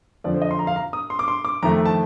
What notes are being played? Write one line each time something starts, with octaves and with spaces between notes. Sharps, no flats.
F2 D3 F3 D5
C5
D#5
C6
A#5
F5
A#5
D#6
C6
D6
C6
D6
F2 D#3 A3 A#5
A5